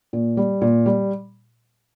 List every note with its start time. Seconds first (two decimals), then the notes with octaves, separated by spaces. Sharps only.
0.13 A#2
0.37 G3
0.61 A#2
0.86 G3